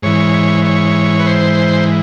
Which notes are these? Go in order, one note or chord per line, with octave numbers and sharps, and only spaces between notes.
G#2 E3 C#5
C#5
B4
C5